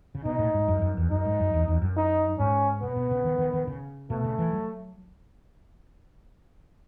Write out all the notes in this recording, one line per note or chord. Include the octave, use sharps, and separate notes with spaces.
C#3
B2 D#4
A2
G#2
F#2
F#2
E2
F#2 D#4
G#2
F#2
E2
E2
F#2
D#4
G#2 C#4
B2 B3
B2
C#3
D#3
D#3
D#3
C#3
B2 A3
C#3
E3
F#3